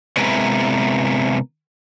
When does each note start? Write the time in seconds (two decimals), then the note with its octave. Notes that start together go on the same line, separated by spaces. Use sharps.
0.17 C3 G#3 B3 E4 A#4 B4